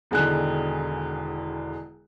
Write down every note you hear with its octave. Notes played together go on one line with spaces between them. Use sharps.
E1 E2 D3 D#3 F#6